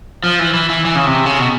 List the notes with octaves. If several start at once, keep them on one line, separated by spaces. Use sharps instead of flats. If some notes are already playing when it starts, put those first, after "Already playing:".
F3
E3
E3
E3
E3
C#3
C3
C#3
B2